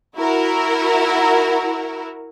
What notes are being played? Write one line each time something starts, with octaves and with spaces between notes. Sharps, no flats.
E4 F#4 A#4